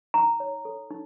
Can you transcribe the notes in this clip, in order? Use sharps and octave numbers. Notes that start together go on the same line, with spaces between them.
D#4 A#5
C#5
A4
D#4